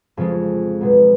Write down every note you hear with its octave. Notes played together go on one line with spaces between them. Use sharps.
F2 C#3 F3 G#3
B1 B2 G#3